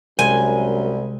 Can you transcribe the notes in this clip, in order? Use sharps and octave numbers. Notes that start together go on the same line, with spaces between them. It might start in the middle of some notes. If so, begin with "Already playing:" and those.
C2 F#2 C3 G#3 C5 G#5